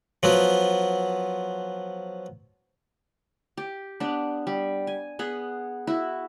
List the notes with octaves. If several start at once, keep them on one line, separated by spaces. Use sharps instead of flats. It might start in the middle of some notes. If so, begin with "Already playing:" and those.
F3 F#3 B3
G4
B3 D4
G3
G#5
B3 G#4 F#5
E4 F#4